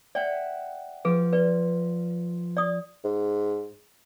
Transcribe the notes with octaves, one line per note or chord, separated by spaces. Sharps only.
D5 E5 F#5 G5
F3 G#4 B4
B4 D5
D5 D#6
G#2